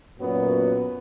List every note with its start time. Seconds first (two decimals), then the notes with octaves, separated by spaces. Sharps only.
0.20 F#2 A#2 F#3 B3